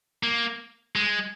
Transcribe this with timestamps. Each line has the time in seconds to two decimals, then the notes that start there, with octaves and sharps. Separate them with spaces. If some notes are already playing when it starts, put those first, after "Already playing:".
0.23 A#3
0.96 G#3